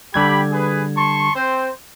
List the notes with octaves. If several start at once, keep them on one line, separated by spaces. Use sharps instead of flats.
D3 G3 G4 B5 G#6
G#4 B4
A5 C6 C#6
C4 C5